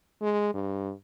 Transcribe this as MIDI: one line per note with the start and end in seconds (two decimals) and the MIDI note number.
0.22 0.53 56
0.54 0.92 43